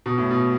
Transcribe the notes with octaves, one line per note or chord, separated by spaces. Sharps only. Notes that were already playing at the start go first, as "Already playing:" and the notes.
B2
A2
B2